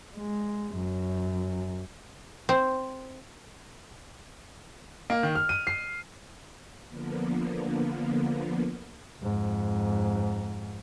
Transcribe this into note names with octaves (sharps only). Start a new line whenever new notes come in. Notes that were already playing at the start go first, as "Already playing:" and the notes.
G#3
F#2
C4
A#3
D#3
F6
D#7
C7
D3 F3 A#3 B3
F2 G#2